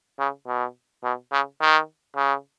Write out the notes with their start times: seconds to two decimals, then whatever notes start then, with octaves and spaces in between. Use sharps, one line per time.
0.19 C#3
0.48 B2
1.04 B2
1.32 C#3
1.61 D#3
2.16 C#3